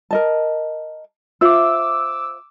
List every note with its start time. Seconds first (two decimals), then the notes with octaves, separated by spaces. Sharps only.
0.11 A#4 D#5 A5
1.41 F4 C5 E5 D6 E6